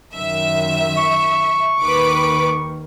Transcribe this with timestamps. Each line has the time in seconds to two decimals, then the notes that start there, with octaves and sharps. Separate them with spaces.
0.17 F#2 D#3 E5
0.97 C#6
1.80 D#2 D#3 B4 D6